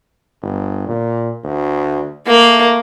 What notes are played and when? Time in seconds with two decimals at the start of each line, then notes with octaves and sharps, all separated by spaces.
0.42 G1
0.88 A#2
1.44 D2
2.27 A3 A#3